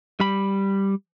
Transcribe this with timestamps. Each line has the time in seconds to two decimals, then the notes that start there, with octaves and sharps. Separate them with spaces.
0.20 G3 B5